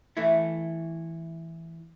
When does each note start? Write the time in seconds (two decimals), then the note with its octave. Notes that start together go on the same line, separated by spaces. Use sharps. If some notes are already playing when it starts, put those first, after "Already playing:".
0.17 E3 A3 E4